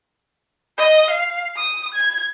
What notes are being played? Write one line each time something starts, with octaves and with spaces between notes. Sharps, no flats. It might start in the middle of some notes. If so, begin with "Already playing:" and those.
D#5
F5
D#6
G#6